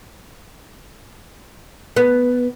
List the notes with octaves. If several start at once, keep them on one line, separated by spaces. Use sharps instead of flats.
B3